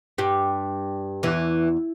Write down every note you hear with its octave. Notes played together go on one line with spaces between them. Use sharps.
G2 G3
E2 E3